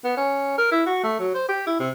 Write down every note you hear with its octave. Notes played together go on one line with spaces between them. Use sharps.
B3
C#4
A#4
E4
F#4
A3
F#3
C5
G4
E4
C3